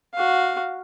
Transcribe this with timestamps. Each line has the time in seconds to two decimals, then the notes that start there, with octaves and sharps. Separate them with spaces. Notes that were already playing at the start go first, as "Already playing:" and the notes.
0.14 F#4 F5